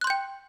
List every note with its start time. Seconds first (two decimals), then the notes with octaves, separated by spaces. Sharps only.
0.01 F#6
0.04 C6
0.07 G6
0.10 G5